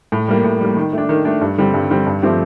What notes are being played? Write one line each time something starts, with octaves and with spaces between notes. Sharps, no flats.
A2
G3 A#3
A2
G3 A#3
D#3
A3 D4
D#3
A3 D4
G2
D3 G3 C4
G2
D3 G3 C4
G2
F3 A3 C4 G4